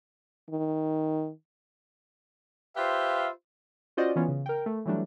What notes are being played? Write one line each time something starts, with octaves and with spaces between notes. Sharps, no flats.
D#3
F4 G4 B4 C5 E5 F5
C#4 F4 F#4 C5 D5 D#5
E3 B3 C#4 F4
C#3
A#4 G5
A3
E3 F#3 G3 A3 D4